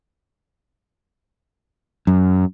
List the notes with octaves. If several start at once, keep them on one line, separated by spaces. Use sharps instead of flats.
F#2